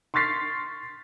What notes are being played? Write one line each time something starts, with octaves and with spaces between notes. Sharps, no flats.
C6 C#6 F6 A6 B6 C7